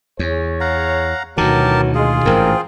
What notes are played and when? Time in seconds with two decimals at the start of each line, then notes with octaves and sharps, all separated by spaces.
0.19 E2 G#4 C#5
0.61 F5 F#5 A#5
1.38 D2 B2 D#3 E3 F#3 G4 A#4 A5
1.95 G#3 F4 G#4
2.25 A1 G#2 C3 D4 A#4 C5 G5